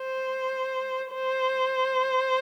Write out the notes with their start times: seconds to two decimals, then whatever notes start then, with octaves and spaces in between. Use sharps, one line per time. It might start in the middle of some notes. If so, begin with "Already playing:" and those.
Already playing: C5
1.12 C5